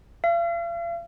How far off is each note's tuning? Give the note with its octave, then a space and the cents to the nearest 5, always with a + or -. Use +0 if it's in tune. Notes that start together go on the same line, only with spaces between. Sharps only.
F5 -40